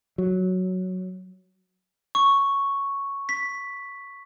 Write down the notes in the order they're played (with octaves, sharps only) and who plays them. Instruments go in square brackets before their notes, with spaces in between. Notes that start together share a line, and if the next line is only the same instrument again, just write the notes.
[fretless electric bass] F#3
[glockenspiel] C#6
B6